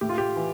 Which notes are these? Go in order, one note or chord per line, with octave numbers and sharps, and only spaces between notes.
A2 G4
F4
G4
E3